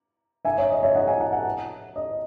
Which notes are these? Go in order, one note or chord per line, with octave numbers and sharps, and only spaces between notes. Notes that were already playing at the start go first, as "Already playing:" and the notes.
E5 G#5
C#5 E5
D#5
C#5 E5
D#5 F#5
E5 G#5
F#5 A5
F#5 A5
D#5